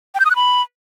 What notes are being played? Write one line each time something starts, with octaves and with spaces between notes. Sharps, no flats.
G5
G6
D#6
F#6
B5